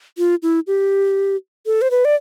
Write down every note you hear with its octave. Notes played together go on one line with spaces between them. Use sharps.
F4
E4
G4
A4
C5
B4
D5